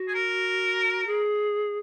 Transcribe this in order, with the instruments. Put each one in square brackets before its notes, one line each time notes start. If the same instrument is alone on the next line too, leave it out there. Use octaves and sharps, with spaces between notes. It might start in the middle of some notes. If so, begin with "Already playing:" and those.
Already playing: [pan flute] F#4
[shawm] G#4
A#4
[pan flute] G#4